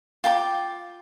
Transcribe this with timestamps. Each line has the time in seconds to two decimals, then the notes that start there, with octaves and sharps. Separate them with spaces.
0.24 F4 G5 A#5 D6